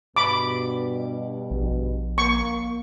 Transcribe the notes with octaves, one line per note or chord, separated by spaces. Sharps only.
G2 B2 B5 D6
A#1
A#3 C#6